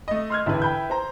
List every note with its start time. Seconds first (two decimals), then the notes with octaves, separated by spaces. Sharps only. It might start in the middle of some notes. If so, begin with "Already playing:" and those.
0.08 A3 D#5
0.30 C6 F6 G#6
0.46 E1 A1 D3 E4 B4
0.62 G5 B5 G6
0.90 C5 A#5